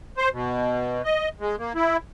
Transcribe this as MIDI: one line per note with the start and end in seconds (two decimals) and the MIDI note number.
0.17 0.29 72
0.33 1.02 47
1.04 1.29 75
1.40 1.56 56
1.59 1.73 58
1.75 1.97 64